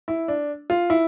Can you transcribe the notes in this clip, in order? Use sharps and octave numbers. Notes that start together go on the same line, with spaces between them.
E4
D4
F4
E4